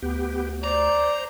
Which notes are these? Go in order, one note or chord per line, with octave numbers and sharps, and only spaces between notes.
D2 B3 G4
C5 D5 A#5